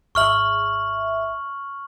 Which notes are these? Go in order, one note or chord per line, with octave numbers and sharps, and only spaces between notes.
G#1 E5 C#6 F6 F#7